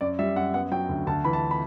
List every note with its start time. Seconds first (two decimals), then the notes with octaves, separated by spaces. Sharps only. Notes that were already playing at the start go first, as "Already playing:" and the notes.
0.01 F#2 D5
0.19 G3 E5
0.36 F#2 F#5
0.54 B3 F#5
0.71 F#3 G5
0.89 D2
1.07 D2 A5
1.24 E3 B5
1.33 A5
1.51 B5